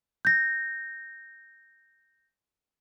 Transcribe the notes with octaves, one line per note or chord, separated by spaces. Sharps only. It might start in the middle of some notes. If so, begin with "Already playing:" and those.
G6 A#6